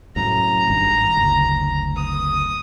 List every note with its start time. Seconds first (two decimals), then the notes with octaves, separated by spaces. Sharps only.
0.16 C2 F#2 A2 A#5
0.70 G#1 G2
1.17 F#1 D2
1.96 D#6